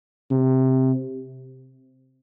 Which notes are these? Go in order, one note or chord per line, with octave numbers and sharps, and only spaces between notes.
C3